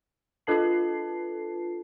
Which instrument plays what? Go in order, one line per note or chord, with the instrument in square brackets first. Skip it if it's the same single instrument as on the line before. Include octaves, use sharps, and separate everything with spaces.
[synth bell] D4 F4 A4 B4 A5 C7